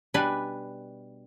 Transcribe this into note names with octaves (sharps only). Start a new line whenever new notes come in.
B2 G3 D4 B4 G#5